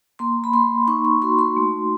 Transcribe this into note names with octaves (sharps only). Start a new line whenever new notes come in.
A#3 C6
B5
A#3 C6
D#4 C#6
C#6
F#4 C6
C6
A3